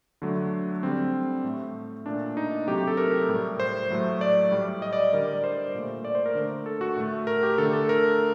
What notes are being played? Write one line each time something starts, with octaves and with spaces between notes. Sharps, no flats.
D3 F#3 A3
D3 G3 C4
A2 A3
A#2 A3 D4
D#4
C3 F#3 A3 G4
G4
A4
A#4
A2 G3
C5
A2 F#3 A3
D5
A2 G3
D#5
D5
D3 G3 A#4
D5
C5
A#2 A3
D5
C5
A#4
D3 A3
A4
F#4
A2 A3
A#4
G4
D3 A3 A4
A4
A#4